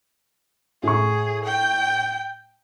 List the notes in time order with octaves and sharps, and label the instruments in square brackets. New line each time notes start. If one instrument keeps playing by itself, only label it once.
[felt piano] A2 C#6 [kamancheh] G#4
[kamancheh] G5